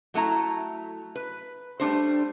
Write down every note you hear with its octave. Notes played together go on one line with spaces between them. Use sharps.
F#3 A3 E4 A#5
B4
G3 A3 D4 C5